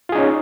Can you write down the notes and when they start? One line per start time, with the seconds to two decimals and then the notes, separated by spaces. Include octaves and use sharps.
0.09 F4
0.12 G#4
0.15 D#4
0.18 C#4